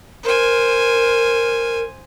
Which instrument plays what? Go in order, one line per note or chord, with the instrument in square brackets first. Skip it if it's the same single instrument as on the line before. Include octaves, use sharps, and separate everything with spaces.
[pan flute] A#4 [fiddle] C5 G#5